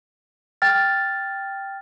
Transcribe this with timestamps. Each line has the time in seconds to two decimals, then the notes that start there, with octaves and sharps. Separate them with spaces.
0.62 G5 F6 A6